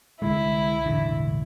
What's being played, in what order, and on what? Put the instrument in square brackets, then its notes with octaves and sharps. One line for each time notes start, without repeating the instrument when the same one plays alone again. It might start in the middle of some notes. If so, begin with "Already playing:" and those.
[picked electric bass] C2 D3 G#3 [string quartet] E4
[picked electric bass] E1 A1 D3